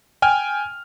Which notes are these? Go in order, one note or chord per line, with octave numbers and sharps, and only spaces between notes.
G5 G#5 F6